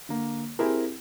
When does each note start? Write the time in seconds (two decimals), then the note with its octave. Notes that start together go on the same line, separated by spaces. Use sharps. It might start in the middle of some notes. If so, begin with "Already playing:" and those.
0.09 D3 A#3
0.59 C4 E4 G4 G#4 A#4